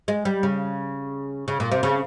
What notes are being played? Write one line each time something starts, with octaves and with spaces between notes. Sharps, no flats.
G#3
G3
C#3
C#3
A#2
C3
C#3